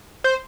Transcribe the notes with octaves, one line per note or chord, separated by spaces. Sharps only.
C5